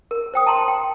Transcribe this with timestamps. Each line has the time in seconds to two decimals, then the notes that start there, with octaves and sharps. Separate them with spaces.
0.11 A#4
0.34 C5 G5 D#6
0.46 A5 A#5 C6
0.68 G5